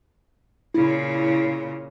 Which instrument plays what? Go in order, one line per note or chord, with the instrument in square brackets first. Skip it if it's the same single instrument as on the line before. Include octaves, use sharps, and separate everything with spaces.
[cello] A#2 C#3 [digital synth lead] E4